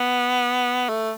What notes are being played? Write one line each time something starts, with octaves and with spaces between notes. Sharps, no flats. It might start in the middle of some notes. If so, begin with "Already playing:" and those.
Already playing: B3
A3